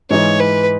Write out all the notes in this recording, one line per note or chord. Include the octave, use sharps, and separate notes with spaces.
G#2 E3 G#3 D#4 C#5
B4